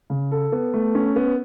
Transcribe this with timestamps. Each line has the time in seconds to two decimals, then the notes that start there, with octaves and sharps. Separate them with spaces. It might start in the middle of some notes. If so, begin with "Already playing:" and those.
0.10 C#3
0.32 A4
0.52 B3
0.74 A3
0.95 C#4
1.16 B3